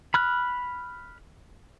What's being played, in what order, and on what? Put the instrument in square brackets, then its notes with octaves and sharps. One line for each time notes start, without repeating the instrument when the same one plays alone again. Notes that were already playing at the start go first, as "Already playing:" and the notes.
[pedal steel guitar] B5 F6 F#6